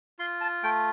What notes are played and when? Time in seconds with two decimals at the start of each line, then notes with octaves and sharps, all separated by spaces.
0.19 F4 C6
0.41 A5
0.63 A3 G5